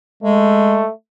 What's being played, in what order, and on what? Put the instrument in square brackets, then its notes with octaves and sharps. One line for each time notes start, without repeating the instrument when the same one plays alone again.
[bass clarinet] G#3 [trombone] A3